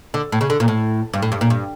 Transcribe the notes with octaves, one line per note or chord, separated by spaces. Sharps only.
D3
A2
C#3
D3
A#2
A2
G2
A2
G2
A#2
G2